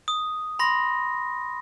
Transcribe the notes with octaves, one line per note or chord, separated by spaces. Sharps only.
D#6
B5 C6 A#6